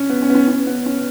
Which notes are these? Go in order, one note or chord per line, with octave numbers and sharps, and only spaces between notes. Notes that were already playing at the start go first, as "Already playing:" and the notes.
Already playing: C#4
B3
C#4
B3
C#4
C#4
B3
C#4